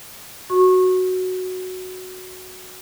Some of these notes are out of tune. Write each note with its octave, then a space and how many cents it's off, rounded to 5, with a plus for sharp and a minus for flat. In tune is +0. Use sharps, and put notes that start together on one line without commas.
F#4 +0 C#6 -25